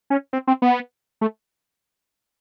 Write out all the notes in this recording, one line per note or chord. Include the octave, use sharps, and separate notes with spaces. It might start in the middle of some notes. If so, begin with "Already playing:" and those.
C#4
C4
C4
B3
A3